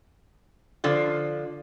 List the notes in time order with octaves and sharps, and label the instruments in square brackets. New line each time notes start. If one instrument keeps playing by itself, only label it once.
[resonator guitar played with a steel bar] D3 F3 F4